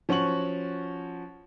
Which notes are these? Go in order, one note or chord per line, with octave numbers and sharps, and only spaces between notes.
F3 C#4 F#4 C#6 F#7